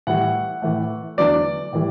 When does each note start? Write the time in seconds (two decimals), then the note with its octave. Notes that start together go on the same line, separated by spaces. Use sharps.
0.07 A2 E3 G3 F#5
0.62 A2 E3 A3
1.17 E2 D3 F#3 A3 D5
1.73 A2 E3 G3